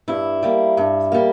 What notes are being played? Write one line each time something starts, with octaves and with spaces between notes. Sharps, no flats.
G2 E4
G3 A#3
G2
G3 A#3